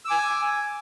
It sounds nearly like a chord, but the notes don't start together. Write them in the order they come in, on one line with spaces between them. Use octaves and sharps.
E6 D6 G#5